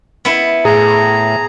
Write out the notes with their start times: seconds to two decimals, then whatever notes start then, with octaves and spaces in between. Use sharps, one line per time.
0.25 B3 E4
0.65 A2 G#4 E5 A#5